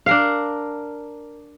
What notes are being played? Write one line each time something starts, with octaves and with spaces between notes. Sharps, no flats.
D4 A#4 F5